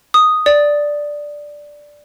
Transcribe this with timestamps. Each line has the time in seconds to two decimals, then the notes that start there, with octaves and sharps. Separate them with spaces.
0.14 D#6
0.46 D5